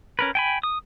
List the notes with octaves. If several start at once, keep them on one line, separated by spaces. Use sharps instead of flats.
C#4 A#4 B4
G5 G#5 B5
D#6